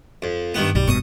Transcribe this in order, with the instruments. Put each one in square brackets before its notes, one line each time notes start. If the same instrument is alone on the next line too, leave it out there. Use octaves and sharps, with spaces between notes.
[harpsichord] F2
G2 D#3 B3
[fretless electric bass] B1 [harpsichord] G3
[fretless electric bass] F1 G2 B2 [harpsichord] C#6 D#6